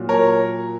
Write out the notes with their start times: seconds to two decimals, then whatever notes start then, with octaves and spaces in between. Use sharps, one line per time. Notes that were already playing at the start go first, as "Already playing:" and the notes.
Already playing: A#2 F#3
0.09 A#4 C#5